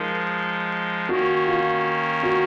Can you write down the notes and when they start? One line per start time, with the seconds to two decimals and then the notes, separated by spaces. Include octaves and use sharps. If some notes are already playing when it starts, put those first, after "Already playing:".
Already playing: F3 G#3 D#4 A#4
1.09 D#3 A#3 C#4 F#4
1.47 F4
2.23 F#4